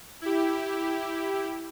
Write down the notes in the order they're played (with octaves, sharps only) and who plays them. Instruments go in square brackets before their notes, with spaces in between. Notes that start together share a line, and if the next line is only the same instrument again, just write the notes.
[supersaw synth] E4 G4